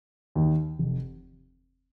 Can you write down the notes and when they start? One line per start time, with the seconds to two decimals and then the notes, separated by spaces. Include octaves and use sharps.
0.35 D#2 D#3
0.79 F1